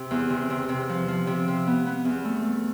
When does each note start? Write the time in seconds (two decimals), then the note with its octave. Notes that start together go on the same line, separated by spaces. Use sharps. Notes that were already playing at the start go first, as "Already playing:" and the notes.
Already playing: C3
0.11 E2
0.30 C3
0.50 C3
0.69 C3
0.89 F3
1.08 F3
1.27 C3
1.48 C3
1.67 B3
1.87 B3
2.05 E2
2.25 A3
2.44 A3